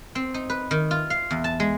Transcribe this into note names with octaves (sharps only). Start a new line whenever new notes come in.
C4
D#4
B4
D#3
F4
F5
E2
A5
G#3